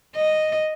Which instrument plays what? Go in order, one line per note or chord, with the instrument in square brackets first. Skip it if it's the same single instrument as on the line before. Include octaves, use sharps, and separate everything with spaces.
[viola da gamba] D#5